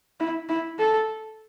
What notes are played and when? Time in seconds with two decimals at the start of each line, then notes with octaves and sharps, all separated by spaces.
0.20 E4
0.49 E4
0.79 A4